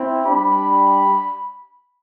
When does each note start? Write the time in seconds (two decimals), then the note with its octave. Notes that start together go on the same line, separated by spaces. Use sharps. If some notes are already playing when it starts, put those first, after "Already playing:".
Already playing: C4 E4
0.26 G3 D4 G4 B5